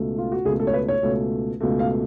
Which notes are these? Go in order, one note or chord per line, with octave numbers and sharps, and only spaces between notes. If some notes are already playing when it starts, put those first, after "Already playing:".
Already playing: C#2 B2 A3
F4
F#4
C#2 B2 A3 G#4
A4
C#5
B4
C#5
C#2 B2 A3
C#2 B2 A3
F5